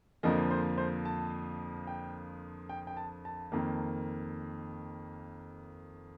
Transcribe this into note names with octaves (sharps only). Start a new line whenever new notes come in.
F2 D3 F3 A#3 D#5
C5
C5
A5
G5
G5
G5
A5
A5
F2 D#3 A#3